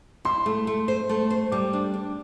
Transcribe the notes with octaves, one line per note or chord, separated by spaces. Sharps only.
E4 C6
A3
A3
C5
A3
C5
G3 D6
D4
D4